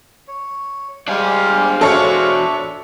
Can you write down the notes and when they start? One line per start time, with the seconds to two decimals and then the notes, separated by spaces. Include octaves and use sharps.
0.28 C#5
1.08 G3 G#3 D4 C5 F5 G#5
1.81 E2 D4 F#4 A4 C#5 E5 C#7